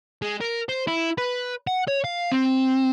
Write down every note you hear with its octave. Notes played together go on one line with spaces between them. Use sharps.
G#3
A#4
C5
E4
B4
F#5
C#5
F5
C4